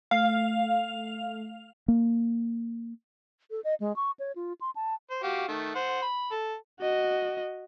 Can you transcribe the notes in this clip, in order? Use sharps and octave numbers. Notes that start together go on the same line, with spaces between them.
A3 F5
A#3
A4
D#5
G#3
C#6
C#5
F4
C6
A5
C5
F#4 G4 F5
D#3 A3
C5 F#5
B5
A4
F#4 D#5